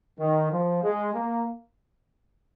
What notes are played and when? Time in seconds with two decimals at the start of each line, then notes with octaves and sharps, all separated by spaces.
0.19 D#3
0.51 F3
0.82 G#3
1.14 A#3